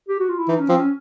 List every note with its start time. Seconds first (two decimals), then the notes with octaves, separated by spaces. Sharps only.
0.09 G4
0.19 F#4
0.29 F4
0.38 E4
0.48 E3 D#4
0.59 C#4
0.69 F3 C4
0.79 C#4